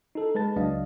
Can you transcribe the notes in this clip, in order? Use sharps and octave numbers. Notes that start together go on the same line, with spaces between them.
D#4 A4
G#3 B4 A5 A6
C#2 F#3 D4 D#5 F5